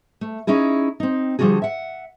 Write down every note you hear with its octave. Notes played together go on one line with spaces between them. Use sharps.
A3
C#4 D#4 E4 G#4
C4 D#4
D3 F3 G3 D4 F#4 G#4
E5 F#5